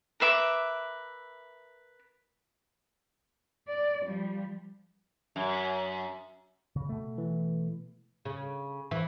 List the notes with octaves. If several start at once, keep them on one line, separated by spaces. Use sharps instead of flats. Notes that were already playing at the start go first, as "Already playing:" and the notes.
A#4 B4 E5 D6
D5
F3 G3
F#2
C#3
B2 A3
E3
C#3
E3